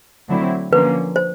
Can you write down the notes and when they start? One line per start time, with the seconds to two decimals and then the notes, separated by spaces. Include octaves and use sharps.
0.29 D3 F#3 A3 C4 E4
0.72 D3 F3 A#3 C#4 B4
1.16 C5